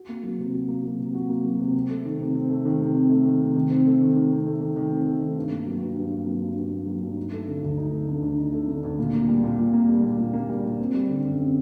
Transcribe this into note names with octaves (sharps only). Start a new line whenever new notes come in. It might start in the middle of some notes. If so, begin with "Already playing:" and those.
Already playing: F#4
A#3
F#3
C3
F#4
A#3
F#3
C3
F#4
A#3
F#3
C3
C4
A3
D#3
C3
C4
A3
D#3
C3
C4
A3
D#3
C3
D#3
C4
A3
D#3
D#3
C4
A3
D#3
D#3
C4
A3
D#3
G2
A#3
F#3
G2
G2
A#3
F#3
G2
G2
A#3
F#3
G2
D#4
A3
D3
D2
D#4
A3
D3
D2
D#4
A3
D3
D2
A#2
A#3
G3
A#2
A#2
A#3
G3
A#2
A#2
A#3
G3
A#2
C4
G3
D3
F#2
C4